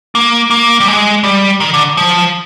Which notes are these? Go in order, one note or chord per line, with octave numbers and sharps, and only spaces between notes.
A#3
A#3
G3
G#3
G3
D#3
D3
F3